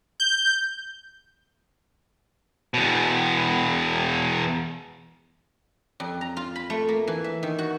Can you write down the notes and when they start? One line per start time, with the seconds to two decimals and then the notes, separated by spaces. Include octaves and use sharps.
0.20 G6
2.74 E2 B2
6.00 F2
6.21 A#5
6.37 F4
6.56 B5
6.70 A3
6.88 A#3
7.07 E3
7.24 E5
7.43 D#3
7.59 F#4